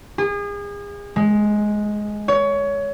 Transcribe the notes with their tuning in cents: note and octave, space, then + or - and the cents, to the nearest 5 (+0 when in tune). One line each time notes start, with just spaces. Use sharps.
G#4 -35
G#3 +10
C#5 +20